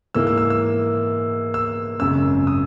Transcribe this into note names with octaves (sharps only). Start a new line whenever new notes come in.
G#2 E3 A#3 E6
E6
E6
E6
E6
G#1 F#2 C#3 E6
D#6